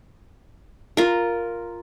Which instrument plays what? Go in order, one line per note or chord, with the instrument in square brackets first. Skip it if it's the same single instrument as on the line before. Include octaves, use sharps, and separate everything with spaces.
[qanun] F4 A#4